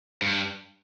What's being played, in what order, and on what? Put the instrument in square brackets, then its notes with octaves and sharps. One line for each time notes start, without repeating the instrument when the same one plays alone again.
[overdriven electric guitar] G2